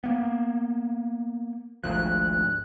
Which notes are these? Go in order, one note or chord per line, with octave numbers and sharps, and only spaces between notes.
A#3 B3
G#1 D2 F3 F#6